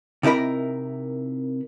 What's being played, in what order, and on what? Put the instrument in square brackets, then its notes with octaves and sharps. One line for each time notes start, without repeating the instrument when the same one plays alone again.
[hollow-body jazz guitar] C3 D#4 E4 A#4 B5